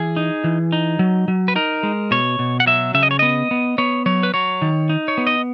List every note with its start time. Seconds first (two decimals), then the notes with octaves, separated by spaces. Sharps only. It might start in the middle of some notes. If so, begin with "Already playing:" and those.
Already playing: E3 G#4
0.17 D#4
0.44 E3
0.72 D#4
0.99 F#3
1.28 F#3
1.48 B4
1.56 D#4 A#4
1.83 G#3
2.11 B2 C#5
2.39 B2
2.60 F#5
2.66 F#3 E5
2.94 C#3 E5
3.03 D#5
3.11 C#5
3.19 B3 D#5
3.51 B3
3.78 B3 C#5
4.06 F#3 C#5
4.23 B4
4.34 F#3 C#5
4.62 D#3
4.89 D#4
5.08 C#5
5.18 B3
5.27 D#5